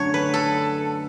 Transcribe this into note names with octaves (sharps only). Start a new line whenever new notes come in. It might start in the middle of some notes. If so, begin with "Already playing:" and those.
Already playing: F#2 D3 F#3 A3 C#5
B4
A4